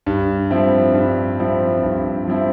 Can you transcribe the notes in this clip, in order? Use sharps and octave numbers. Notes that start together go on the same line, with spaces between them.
G2
F3 C4 E4
G2
F3 C4 E4
G2
F3 C4 E4